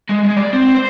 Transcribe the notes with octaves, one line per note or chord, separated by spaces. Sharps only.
G#3
G#3
D5
C4
C5